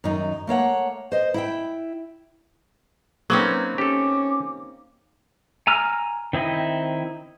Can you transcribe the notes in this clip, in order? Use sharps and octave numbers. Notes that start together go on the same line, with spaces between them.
F#2 D#3 F#3 D#4
A3 A#3 C#5 F#5
C5 D#5
E4 E5 G5
F#3 A#3 C4 C#4 D#4 B4
C#4 G4 A4 D6
G#5 A#5 E6 F6
D#3 C4 E4 D#5